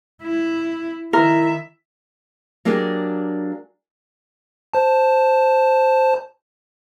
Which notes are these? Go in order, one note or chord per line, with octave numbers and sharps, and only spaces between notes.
E4
D#3 E4 A#4 E5
F#3 A#3 D4 G4 G#4
C5 A5